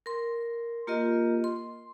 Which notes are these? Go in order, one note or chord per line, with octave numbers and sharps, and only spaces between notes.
A#4 C6
A#3 F4 G4 A#4 D#5
C6